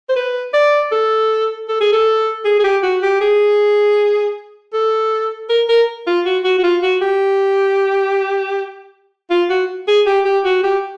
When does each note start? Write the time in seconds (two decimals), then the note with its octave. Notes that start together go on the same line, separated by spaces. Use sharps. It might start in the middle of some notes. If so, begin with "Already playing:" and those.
0.09 C5
0.16 B4
0.54 D5
0.92 A4
1.69 A4
1.81 G#4
1.93 A4
2.45 G#4
2.59 G#4
2.64 G4
2.83 F#4
3.03 G4
3.21 G#4
4.74 A4
5.49 A#4
5.69 A#4
6.07 F4
6.26 F#4
6.44 F#4
6.59 F#4
6.64 F4
6.83 F#4
7.02 G4
9.30 F4
9.50 F#4
9.88 G#4
10.06 G4
10.25 G4
10.45 F#4
10.64 G4